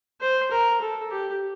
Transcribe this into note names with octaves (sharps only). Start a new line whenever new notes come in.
C5
A#4
A4
G4